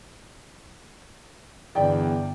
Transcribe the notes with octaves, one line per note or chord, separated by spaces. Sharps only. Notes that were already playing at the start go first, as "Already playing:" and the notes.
G1 E2 D5 G5